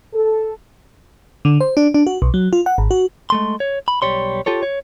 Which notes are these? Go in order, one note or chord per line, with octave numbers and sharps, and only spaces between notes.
A4
D3
C5
D4
D4
F#4
B1
F#3
F4
F#5
G#1
F#4
G#3 A3 C6
C#5
B5
B1 G3 C#5 C6
F4 G4 A4 C#5
C#5